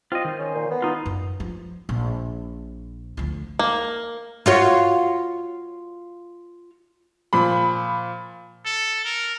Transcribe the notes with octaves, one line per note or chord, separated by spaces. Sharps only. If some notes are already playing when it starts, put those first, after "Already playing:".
C4 F4 D#5
D#3 C5
C#4
A#2
B3
D#4 F4
F#2
F3
A#1
D2 F3
A#3
F4 F#4 C#5
A#2 F3 B5
A4
A#4